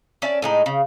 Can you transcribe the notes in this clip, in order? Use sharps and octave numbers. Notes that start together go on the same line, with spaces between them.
C#4 D5 E5 A5
A2 G#3 D#4
C#3